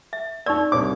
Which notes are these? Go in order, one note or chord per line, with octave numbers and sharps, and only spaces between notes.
E5
D#4 D5 C#6 E6
C2 C#5 D6